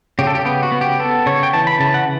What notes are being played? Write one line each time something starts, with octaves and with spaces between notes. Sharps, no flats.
C#3 G4
A4
G4
B3 G4
F#4
B3
G4
B3 A4
C#3 C#5
G5
E3 A5
B5
C#3 A5
F#5